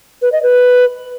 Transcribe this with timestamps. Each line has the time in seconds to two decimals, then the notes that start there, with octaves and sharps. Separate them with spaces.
0.22 B4
0.32 D#5
0.43 B4